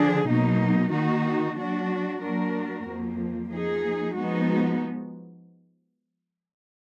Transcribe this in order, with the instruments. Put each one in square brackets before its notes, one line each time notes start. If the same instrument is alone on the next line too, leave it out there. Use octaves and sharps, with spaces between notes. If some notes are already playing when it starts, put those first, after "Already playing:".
Already playing: [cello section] D3 F3 D4 G#4
B2 F#3 A#3 D#4
D#3 A#3 D#4 F#4
F#3 D4 F#4
F#3 A#3 D4 F#4 A#4
F2 F3 A#3
F3 A#3 D#4 G#4
F3 G#3 B3 D#4 F#4